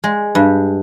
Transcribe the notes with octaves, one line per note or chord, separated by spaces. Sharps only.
G#3
G2